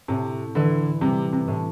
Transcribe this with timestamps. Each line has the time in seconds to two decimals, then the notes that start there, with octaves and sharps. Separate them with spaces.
0.08 A2 C3
0.55 D3 E3
1.01 C3 G3
1.33 C3
1.48 A2